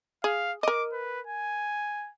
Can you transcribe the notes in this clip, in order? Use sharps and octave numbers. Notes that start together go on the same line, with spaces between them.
G#4 F5
A#4 D#5 D6
B4
G#5